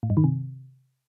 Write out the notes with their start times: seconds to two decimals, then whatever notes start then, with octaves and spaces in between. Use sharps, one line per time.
0.03 A2
0.10 G2
0.17 D#3
0.24 C3